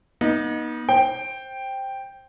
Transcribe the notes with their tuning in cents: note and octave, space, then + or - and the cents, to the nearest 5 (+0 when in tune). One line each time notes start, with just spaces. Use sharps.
B3 -40 D#4 +0
C5 +15 G5 +0